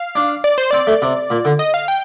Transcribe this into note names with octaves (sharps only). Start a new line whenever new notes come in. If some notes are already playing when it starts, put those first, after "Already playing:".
Already playing: F5
D4
D5
C5
C4 D5
A3
C3
A#2
D3
D#5
F5
G5